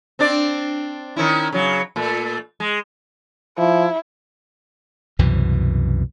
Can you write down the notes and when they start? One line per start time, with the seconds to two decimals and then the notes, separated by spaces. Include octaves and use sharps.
0.19 C4 D4 D5
1.16 D#3 C#4 E4
1.52 C#3 F#3
1.96 A#2 A3
2.60 G#3
3.58 F3 E4
5.19 C2 F#2 B2 E3